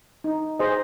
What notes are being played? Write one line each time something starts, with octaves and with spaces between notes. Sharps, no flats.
D#4
G#4 C5 D#5